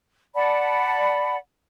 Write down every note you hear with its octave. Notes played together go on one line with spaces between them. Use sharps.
D5 F#5 A5 B5